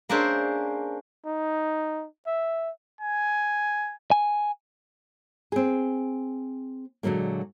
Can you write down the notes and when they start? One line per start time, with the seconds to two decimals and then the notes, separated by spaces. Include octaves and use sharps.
0.09 A#3 C#4 D4 G#4 C5 E5
1.26 D#4
2.27 E5
3.01 G#5
4.11 G#5
5.52 C4 G#4
7.03 A#2 D3 F#3 G#3 A#3